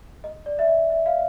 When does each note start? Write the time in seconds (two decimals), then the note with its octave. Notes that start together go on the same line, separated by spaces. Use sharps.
0.24 D#5
0.46 D5
0.59 E5
0.68 D#5
0.90 E5
1.06 F5